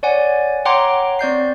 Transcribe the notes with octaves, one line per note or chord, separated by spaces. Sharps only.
C#5 D5 F#5 G#5
C#5 F#5 G5 A#5 C6 D6
C4 D5 G6 C7